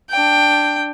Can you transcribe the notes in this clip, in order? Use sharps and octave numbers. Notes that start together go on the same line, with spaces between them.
D4 G5